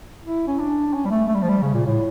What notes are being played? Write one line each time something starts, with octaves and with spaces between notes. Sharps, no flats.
E4
C#4
D4
C#4
G3
A3
A3
G3
F3
G3
C#3
A#2
A2